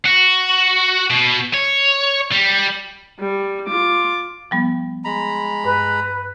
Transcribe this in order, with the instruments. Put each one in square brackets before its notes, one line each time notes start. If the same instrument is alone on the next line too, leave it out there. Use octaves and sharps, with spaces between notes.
[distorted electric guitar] F#4
B2
C#5
G3
[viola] G3
F4 D6
[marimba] F3 G3 B3
[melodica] G#3 A#5 B5
[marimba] G2 [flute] B4